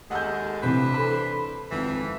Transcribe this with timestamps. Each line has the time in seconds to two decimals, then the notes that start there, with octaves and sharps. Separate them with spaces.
0.11 D#2 G#3 A3 F#5 E6 G6
0.63 C3 E3 D4 B4 C5
0.94 A4 B5
1.72 G#1 F2 E3